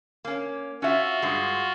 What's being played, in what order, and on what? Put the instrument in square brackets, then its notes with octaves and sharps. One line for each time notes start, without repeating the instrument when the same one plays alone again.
[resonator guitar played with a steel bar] A#3 C#4
[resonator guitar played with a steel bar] C#4 E5 [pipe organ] F4 F#4
[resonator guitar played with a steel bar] G2 G#3